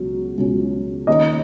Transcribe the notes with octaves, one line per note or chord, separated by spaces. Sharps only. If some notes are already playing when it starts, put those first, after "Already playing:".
Already playing: C#2 B2 F#3
C#2 B2 F#3 C#4
D#2 D#3 A#3 C#4 D#5